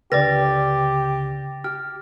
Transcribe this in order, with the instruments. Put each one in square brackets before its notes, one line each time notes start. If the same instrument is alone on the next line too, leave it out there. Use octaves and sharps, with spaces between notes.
[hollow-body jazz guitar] C#2 D3 [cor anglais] G4 [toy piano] B4 D5 [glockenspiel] D6 A6 A#6
[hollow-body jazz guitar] G4 [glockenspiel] F6